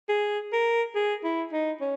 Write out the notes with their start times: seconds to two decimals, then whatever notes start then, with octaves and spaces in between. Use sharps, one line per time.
0.09 G#4
0.53 A#4
0.95 G#4
1.24 E4
1.52 D#4
1.81 C#4